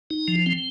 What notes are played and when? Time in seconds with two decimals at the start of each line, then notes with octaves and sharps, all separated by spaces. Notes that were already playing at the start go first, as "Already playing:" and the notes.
0.11 D#4
0.28 F3
0.46 C4